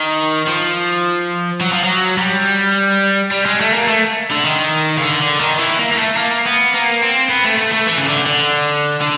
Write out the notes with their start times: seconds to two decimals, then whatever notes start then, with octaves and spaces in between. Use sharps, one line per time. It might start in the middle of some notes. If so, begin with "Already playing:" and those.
Already playing: D#3
0.47 F3
1.61 F#3
1.73 F3
1.84 F#3
2.17 G3
3.31 G3
3.46 G#3
3.61 A3
3.74 A#3
3.88 A3
4.31 D3
4.45 D#3
4.97 C#3
5.02 D3
5.22 D3
5.41 D#3
5.59 E3
5.79 A#3
5.92 A#3
5.98 A3
6.17 A#3
6.45 B3
6.74 A#3
7.02 C4
7.30 B3
7.45 A3
7.58 A3
7.73 A3
7.87 E3
7.98 C#3
8.06 D3
8.26 D3
9.01 D3